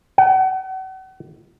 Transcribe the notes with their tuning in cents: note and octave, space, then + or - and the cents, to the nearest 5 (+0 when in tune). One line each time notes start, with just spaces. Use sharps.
F#5 +40